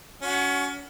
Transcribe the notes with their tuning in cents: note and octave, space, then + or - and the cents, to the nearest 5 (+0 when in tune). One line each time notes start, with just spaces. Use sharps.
C#4 +30 F#4 +0